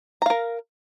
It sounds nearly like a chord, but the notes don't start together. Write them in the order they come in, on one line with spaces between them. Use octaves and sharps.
A#5 F5 A#4